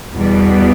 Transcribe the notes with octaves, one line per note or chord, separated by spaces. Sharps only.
E2 B2 G3 B3